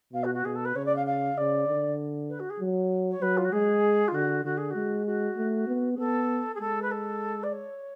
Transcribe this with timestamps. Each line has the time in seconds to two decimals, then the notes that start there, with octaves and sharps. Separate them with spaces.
0.13 B2 F5
0.24 F#4
0.34 F#4
0.44 B2 G#4
0.55 A4
0.65 B4
0.75 C#3 C#5
0.85 D5
0.96 F5
1.06 F5
1.37 C#3 D5
1.68 D3
2.29 B4
2.39 F#4
2.49 G#4
2.60 F#3
3.10 C#5
3.22 F#3 B4
3.37 F4
3.44 F#4
3.52 G#3 G#4
4.08 F4
4.14 D3 F#4
4.45 D3 F#4
4.57 G#4
4.70 G#3 F#4
5.06 F#4
5.37 A3
5.67 B3
5.95 G#4
5.98 B3 A4
6.54 G#4
6.60 G#3 A4
6.82 B4
6.91 A4
7.43 D5
7.52 C#5